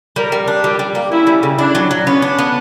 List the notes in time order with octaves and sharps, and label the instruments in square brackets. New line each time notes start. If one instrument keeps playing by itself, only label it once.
[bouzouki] G3 [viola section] A#4
[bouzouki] G3
D4
[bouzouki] G3 [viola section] G4
[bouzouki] G3
A#3
[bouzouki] C#4 [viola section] E4
[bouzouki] G3
C#3
[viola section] D4 [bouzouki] E4
[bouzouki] F#3
F#3
[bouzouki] B3 [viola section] C#4
[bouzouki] D4
B3